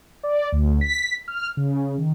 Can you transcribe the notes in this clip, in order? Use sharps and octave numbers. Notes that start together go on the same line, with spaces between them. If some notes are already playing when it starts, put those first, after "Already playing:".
D5
D2
B6
F6
C#3
D#3